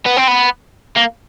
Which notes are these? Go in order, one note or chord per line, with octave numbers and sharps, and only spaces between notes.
B3
C4
B3
A#3